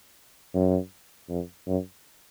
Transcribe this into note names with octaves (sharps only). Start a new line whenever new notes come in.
F#2
F2
F#2